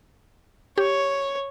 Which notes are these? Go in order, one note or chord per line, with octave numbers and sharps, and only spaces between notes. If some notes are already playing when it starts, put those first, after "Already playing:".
G4 C#5